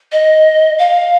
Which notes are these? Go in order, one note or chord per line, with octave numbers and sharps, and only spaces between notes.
D#5
F5